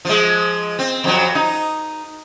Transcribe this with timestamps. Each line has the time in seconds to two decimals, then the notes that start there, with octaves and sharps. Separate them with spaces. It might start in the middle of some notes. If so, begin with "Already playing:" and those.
0.05 F3 G#3
0.79 C4
1.04 F2 F#3
1.35 D#4